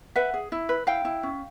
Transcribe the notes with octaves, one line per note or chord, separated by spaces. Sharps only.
B4 E5 F#5
G#4
E4
B4
E4 F5 G5
E4
C#4